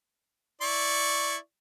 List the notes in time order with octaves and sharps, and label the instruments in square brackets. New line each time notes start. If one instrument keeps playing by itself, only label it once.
[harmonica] E4 D5 C#6